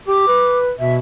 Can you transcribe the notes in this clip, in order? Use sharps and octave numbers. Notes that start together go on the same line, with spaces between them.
G4 D6
B4
B2 E5